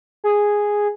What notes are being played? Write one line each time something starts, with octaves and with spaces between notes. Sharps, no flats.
G#4